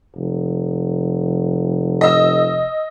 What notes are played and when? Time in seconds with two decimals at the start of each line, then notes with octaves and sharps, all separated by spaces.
0.16 F1
2.01 D#5 E6